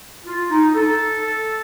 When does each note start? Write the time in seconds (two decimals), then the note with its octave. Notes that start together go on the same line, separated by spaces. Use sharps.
0.26 F4
0.51 D#4
0.74 A4